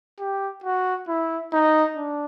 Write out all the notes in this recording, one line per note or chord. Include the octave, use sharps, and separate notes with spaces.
G4
F#4
E4
D#4
D4